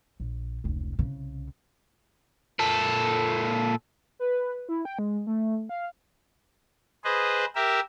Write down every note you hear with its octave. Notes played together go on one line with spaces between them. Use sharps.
A#1
F1 C#2
C2 C#3
A#2 A4
B4
E4
G5
G#3
A3
F5
G#4 B4 C5 D#5
G4 A#4 E5